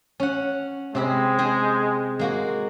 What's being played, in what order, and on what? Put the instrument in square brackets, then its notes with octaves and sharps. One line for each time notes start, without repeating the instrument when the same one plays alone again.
[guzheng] C#4 F#5
[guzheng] C3 C4 B5 [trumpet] G#3
[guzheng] G#4 C5 G5
G#3 A#3 F#4